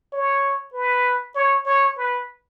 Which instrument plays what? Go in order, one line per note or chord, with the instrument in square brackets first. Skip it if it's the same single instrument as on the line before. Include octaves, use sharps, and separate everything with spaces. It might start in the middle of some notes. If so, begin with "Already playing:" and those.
[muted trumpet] C#5
B4
C#5
C#5
B4